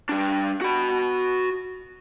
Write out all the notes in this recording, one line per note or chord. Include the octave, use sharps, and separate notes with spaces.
G3 D4
F#4 B5